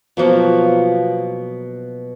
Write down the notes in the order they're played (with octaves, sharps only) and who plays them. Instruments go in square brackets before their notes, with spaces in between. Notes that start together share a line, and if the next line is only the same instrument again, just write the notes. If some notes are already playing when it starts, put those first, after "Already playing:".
[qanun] B2 F3 F#3 A#3